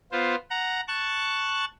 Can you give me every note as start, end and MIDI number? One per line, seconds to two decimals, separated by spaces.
0.12 0.35 59
0.12 0.35 65
0.12 0.35 72
0.50 0.81 78
0.50 0.81 82
0.88 1.65 81
0.88 1.65 85
0.88 1.65 90